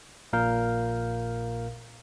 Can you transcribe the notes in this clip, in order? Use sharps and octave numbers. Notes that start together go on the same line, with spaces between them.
A#1 A#2 A#4 F5 G6